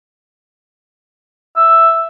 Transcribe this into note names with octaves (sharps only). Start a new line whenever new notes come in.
E5